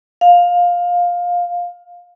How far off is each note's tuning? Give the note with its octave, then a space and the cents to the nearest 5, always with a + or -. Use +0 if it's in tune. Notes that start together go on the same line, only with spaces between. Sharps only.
F5 +15